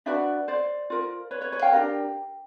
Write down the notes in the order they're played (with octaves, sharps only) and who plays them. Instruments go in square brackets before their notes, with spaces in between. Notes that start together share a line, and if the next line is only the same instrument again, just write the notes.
[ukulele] D4 F#4 B4 D5 E5
C5 D5
F4 A#4
B4 C#5
B4 C#5
B4 C#5
F5 G5
D4 G4 A#4